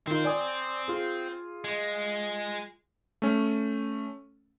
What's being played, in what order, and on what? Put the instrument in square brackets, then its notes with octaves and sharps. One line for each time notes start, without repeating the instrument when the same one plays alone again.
[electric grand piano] D#3 F4 [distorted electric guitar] C4
[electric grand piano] D5 G#5 D#6
F4 G#4
[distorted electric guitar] G#3
[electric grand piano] A3 C#4